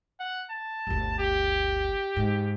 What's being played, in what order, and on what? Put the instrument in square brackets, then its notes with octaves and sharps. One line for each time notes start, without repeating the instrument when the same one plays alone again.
[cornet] F#5
A5
[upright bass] G1 D2
[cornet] G4
[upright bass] G#2